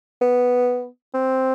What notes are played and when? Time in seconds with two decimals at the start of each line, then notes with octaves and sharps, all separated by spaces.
0.21 B3
1.14 C4